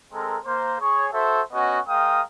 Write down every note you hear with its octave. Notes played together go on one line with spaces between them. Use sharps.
G#3 C4 A4 A#4
A#3 C5
G#4 C#5
F#4 A4 C5 E5
B3 C#4 F#4 D#5
G#3 A#4 F5 G5 D#6